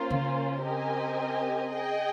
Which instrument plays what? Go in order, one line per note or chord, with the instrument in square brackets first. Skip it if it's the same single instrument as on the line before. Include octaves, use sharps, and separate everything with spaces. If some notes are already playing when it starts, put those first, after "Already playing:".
Already playing: [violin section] A#3 C#4 F4 C5
[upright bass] C#3
[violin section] C4 G4 A#4 D#5 G#5
G#4 D#5 G5